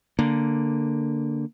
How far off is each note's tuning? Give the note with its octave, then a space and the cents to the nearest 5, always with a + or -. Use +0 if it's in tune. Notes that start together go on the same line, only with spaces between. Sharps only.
D3 +0 A#3 +0